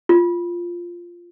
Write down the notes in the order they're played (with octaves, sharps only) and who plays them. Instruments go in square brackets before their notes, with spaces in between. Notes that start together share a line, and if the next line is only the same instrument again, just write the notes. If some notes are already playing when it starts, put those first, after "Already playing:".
[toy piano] F4